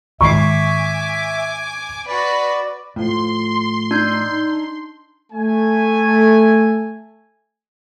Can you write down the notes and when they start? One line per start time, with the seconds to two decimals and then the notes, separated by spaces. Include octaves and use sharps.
0.21 G#2 D#3 G#3 E5 G#5 C#6 D6 C7
2.07 F#4 B4 D5
2.96 A2 F3 C6
3.91 D4 D#4 G6
5.32 A3 G#5